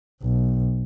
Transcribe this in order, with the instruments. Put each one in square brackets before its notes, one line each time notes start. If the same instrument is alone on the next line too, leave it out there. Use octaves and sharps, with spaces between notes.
[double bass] B1